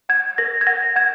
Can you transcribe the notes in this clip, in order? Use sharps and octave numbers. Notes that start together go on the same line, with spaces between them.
F#5 G#6
A#4 A#6
G#6
F#5 A#6
F#5 G#6